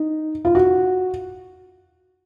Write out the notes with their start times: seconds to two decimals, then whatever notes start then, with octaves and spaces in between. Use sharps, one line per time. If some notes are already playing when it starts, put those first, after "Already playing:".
Already playing: D#4
0.45 F4
0.55 F#4